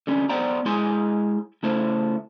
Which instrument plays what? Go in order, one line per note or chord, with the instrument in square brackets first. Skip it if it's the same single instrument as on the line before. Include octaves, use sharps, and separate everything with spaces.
[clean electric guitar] D3 G3 C#4
B3 C5 D5 F#5 G5 A#5
G#3 E4 G#4 G#5 C6
C#3 A3 E4 C5